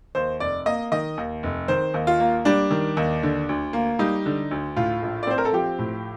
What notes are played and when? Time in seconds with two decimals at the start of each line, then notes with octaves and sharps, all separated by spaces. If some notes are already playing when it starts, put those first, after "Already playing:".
0.15 D#2 C5
0.40 F1 D5
0.66 A#3 D#5
0.92 D#3 D#5
1.17 D#2
1.43 F1
1.68 D#3 C5
1.94 D#2
2.07 F4
2.20 A#3
2.45 G3 D4
2.71 D#3
2.97 D#2
3.23 D3
3.49 D2
3.73 A#3
3.99 G3 D#4
4.26 D3
4.51 D2
4.76 A2 F4
5.02 A#1
5.23 D5
5.27 C4 C5
5.38 A#4
5.45 A4
5.53 F3 G4
5.79 A2